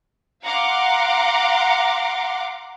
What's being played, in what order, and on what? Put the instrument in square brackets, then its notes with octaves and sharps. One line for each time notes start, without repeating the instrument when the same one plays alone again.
[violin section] F5 F#5 A#5 C6 D6